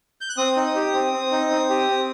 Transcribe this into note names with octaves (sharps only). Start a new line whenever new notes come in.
G6
F#6
C4 D#6
D#4
G4
C4
C4
D#4
C4
G4
C4